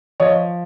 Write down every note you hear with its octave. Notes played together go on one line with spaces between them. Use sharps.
F3 C#5 D#5